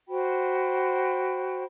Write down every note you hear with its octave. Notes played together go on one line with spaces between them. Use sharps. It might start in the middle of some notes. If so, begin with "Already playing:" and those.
F#4 C5 G5 B5